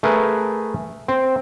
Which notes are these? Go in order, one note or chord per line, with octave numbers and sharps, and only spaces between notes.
A3 G#4 A#4 B4
C4